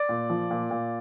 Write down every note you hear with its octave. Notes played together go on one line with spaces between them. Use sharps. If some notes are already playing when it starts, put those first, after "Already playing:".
Already playing: D5
A#2
F3
A#2
A#2